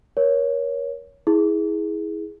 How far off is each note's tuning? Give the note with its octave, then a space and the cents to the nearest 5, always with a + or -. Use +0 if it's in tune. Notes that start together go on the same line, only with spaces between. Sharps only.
A#4 +35 C#5 +10
E4 -20 G#4 +0